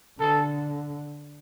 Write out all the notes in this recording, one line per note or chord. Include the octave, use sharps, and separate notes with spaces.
D3 A4